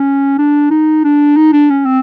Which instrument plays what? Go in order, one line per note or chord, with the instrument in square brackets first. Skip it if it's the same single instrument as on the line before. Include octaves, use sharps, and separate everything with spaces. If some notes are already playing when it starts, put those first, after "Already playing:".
Already playing: [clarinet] C#4
D4
D#4
D4
D#4
D4
C#4
C4